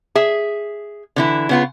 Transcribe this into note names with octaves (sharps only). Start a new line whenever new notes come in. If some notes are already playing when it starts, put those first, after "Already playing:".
G#4 E5
D3 E3 E4
C#3 B3 F4